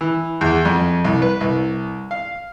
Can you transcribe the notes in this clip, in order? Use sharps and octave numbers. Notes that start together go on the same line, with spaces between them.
E3
E2
F2
C2
B4
C2
F5